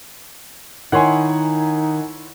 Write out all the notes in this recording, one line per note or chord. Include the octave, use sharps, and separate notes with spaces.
D#3 D#4 E4 C#5 F#5 G#5 C6